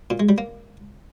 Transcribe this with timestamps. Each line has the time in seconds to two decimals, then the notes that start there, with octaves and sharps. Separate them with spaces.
0.10 A#2
0.20 G#3
0.29 G3
0.38 A#3